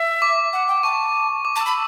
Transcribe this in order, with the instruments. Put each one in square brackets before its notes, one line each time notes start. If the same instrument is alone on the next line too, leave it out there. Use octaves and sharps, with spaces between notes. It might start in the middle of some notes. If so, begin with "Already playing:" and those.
Already playing: [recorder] E5
[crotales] D6
[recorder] F#5
G5
[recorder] A5 [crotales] C#6
[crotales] D6
[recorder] A5
[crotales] E6
[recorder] B5